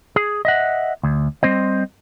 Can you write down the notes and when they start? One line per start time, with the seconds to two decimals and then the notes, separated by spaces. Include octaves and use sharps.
0.16 G#4
0.45 D#5 E5 F#5
1.03 D2
1.43 G3 C4 C5 D#5